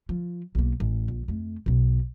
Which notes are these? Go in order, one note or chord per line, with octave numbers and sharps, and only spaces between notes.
F3
B1 A#3
A1
A#1
F2 A3
B1 B2